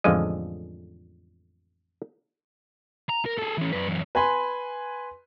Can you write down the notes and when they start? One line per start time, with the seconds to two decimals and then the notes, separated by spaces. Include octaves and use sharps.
0.04 A1 F2 D3 F3 G#3 D#5
3.09 A#5
3.26 A#4
3.39 G#4 A4
3.58 E3 C#4
3.73 F#2 B4
3.88 F#2 E3
4.15 B4 G#5 B5 C6